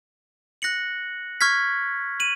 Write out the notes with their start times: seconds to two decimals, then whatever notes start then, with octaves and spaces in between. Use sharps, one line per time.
0.62 F#6 A#6 C#7 F#7
1.41 C#6 F6 G#6 B6
2.20 D#7 F#7